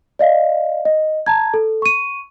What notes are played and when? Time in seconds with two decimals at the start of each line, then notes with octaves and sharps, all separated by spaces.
0.19 D5 D#5 F5
0.85 D#5
1.26 A5 A#5 G#6
1.54 A4
1.82 C#6 D#7